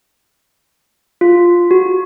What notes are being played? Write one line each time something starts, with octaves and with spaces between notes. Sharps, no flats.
F4
F#4